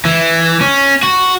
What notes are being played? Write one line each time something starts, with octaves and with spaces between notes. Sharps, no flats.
E3
C#4
F#4